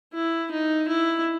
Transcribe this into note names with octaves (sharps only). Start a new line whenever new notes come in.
E4
D#4
E4